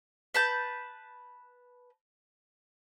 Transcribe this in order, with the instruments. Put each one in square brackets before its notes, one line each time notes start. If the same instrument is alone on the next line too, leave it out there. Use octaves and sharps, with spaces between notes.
[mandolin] B4 A5 G6